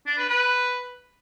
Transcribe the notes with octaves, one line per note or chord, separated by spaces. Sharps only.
D4
B4
B4